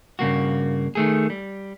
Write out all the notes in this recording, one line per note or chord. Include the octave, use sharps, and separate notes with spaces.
G2 C#3 A#3 F#4
D#3 A3 G#4
G3